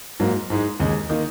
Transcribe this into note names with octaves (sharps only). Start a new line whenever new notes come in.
G#2 F#3 A#3
G#2 G#3 D#4
D#2 C#3 G#3
D#3 A#3 D#4